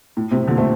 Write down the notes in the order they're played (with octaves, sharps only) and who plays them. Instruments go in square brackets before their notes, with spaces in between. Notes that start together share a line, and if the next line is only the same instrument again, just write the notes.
[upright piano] A2
A2 C3
A#2 D3
A3 C4